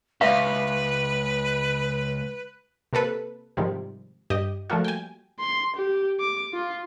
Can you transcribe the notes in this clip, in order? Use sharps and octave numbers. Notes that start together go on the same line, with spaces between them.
C#2 B4 E5 F5
C3 A#3 A4 B4
G#2 C3 D#3 F3 G3
G2 G4 D#5
F3 G3 A3 A#3 F4 F#4
G5 G#5
C6
G4
D6
F4